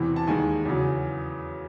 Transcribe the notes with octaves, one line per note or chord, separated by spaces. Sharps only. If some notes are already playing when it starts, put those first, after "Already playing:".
Already playing: E2 C3 E3
A5
D#2 D#3 G#3 G#5
E2 C#3 F#3